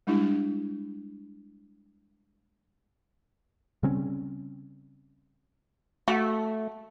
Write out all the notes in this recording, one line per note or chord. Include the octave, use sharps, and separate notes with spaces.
G3 G#3 D4 E4 G4
C#3 G3 C4 C#4
A3 F#4